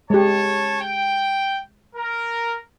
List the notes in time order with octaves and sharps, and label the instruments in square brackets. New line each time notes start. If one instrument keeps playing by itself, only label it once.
[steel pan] G#3 G4 [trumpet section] C#4 C#5 A5
[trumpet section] G5
A#4